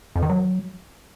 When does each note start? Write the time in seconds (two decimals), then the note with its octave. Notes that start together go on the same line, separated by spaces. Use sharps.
0.16 F2
0.23 D#3
0.30 F#3